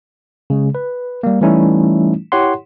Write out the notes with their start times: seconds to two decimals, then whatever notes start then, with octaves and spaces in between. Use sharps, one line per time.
0.50 C#3 G#3
0.75 B4
1.23 G3 A#3
1.41 E3 G3 A3 C#4 D#4 E4
2.32 E4 G4 C#5 F#5 C6